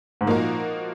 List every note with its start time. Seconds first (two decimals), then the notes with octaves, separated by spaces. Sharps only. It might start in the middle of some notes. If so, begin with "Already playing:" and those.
0.21 G#2
0.26 A#2 F3 A#3 D#4 F#4 A#4